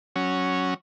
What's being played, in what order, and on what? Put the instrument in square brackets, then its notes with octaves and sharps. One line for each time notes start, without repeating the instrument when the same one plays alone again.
[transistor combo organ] F#3 C#4